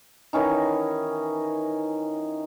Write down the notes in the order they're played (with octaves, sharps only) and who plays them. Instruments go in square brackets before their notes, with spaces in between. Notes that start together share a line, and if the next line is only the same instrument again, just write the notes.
[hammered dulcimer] D#3 E3 C#4 D#4